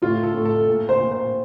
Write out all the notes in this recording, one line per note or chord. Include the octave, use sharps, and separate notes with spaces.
A2 F4
A4
A2
A4
A#2
C5
A#2
C5